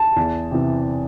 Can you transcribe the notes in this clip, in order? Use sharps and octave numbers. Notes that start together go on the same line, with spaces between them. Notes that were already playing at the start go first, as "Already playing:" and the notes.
Already playing: A5
E2
C3 E3